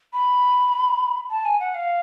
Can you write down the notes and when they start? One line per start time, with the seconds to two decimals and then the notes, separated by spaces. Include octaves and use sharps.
0.13 B5
1.31 A5
1.45 G#5
1.60 F#5
1.75 F5